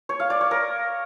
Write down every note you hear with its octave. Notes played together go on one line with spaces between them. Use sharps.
C#5
F5
D5
C#5
A#4